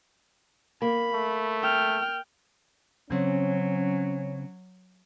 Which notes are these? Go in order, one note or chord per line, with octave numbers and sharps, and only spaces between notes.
A#3 B5
A3
G5 F6
C#3 F#3 C4 C#4